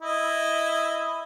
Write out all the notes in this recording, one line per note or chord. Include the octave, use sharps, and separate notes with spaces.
E4 D#5